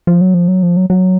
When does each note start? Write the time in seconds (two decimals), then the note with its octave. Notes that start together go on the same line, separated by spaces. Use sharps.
0.07 F3
0.21 F#3
0.34 F3
0.48 F#3
0.63 F3
0.77 F#3
0.90 F#3